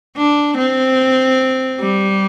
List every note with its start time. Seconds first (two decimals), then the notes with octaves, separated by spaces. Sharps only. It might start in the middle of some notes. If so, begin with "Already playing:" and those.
0.17 D4
0.57 C4
1.80 G3